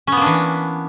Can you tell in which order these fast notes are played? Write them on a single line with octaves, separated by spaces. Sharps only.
C#4 B3 A#3 D4 E3